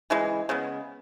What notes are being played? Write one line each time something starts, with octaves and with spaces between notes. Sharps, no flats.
C#3 E3 G#3
C#3 G#3 B3